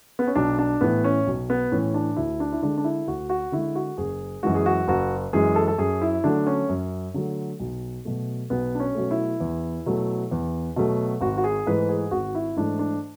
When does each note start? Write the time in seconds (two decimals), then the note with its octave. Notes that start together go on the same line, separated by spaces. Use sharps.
0.19 B3
0.27 C#4
0.35 B1 D4
0.59 D4
0.81 A2 E3 B3
1.04 C#4
1.27 B1
1.50 B3
1.72 A2 E3 C#4
1.94 D4
2.16 D2 E4
2.40 D4
2.52 E4
2.63 D3 G#3 D4
2.78 D4
2.84 E4
3.07 D2 F#4
3.29 F#4
3.52 D3 G#3 E4
3.75 F#4
3.98 F#1 G#4
4.43 F#2 E3 G#3 F#4
4.55 G#4
4.66 F#4
4.88 F#1 F#4
5.33 F#2 E3 G#3 G#4
5.56 A4
5.68 A4
5.78 F#2 G#4
6.02 E4
6.24 D3 F#3 A3 D4
6.47 C#4
6.69 F#2
7.14 D3 F#3 A3
7.60 B1
8.05 B2 F#3 A3
8.50 B1 B3
8.75 D4
8.80 C#4
8.95 B2 F#3 A3
9.11 E4
9.40 E2
9.86 B2 F#3 A3
10.31 E2
10.76 B2 F#3 A3
11.21 G#1 F#4
11.37 F#4
11.44 G#4
11.66 G#2 E3 A3 B4
11.89 G#4
12.11 G#1 F#4
12.35 E4
12.56 G#2 E3 A3 D4
12.79 D4